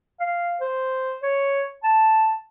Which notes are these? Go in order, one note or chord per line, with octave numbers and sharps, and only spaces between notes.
F5
C5
C#5
A5